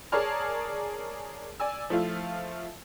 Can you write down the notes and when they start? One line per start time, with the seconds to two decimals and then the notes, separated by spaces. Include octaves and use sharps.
0.12 G#4 A#4 C#5 D5 A5 F6
1.60 D5 G#5 E6
1.90 F3 A3 E4 F4